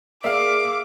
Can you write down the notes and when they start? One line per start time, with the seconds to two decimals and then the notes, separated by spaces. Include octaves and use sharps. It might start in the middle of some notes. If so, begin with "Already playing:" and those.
0.24 A#3 G#4 A#4 D5 E5 F5 D6